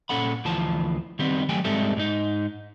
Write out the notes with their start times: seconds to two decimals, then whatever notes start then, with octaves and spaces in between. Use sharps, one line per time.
0.09 A#2 C#4 A4 F#5 B5
0.45 D2 E3 F3 A5
1.19 D#3 G3 B3 C4
1.49 F#3 G3 A3 G5 G#5
1.65 G#2 G3 G#3 C4 A4 E5
1.97 G#2 D#4